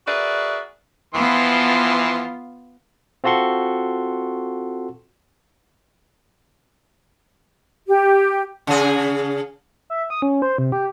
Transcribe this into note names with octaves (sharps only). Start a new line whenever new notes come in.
F#4 G#4 A#4 B4 D5 E5
E3 F3 B3 F4 C6
C4 F4 F#4 A4 C6 C#6
G4
C#3 G#4
E5
D#6
C#4
C5
C3
G4